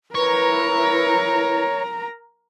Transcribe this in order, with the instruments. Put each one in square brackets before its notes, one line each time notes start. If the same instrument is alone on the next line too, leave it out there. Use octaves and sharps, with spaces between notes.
[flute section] E4 B4 [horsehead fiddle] A#4 A#5 [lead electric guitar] C#5